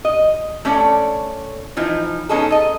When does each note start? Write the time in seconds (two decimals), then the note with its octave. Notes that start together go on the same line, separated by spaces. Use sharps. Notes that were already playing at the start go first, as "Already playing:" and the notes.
0.05 D#5
0.65 A3 C#4 A4 C#5 D5
1.77 E3 F3 D#4
2.29 G#3 B3 C#4 D#4 G#4 A4
2.50 A4 D#5